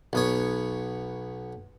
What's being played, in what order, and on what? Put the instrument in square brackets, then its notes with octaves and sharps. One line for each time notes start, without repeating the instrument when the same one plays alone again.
[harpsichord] B1 B3 C#5